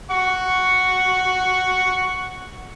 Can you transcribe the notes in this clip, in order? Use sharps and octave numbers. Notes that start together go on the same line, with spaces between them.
F#5 C#6